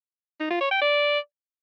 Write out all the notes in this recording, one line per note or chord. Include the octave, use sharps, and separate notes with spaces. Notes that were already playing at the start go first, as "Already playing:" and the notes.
D#4
F4
C#5
G5
D5